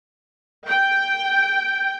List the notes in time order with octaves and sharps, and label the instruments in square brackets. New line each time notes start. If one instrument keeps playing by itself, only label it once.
[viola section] G5